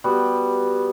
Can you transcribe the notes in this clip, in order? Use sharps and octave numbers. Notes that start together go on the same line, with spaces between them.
G3 B3 F#4